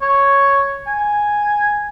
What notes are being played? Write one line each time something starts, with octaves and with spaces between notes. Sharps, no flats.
C#5
G#5